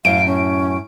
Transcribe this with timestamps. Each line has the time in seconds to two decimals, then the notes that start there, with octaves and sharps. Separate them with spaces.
0.05 F#2 A2 F5 D7
0.26 C#4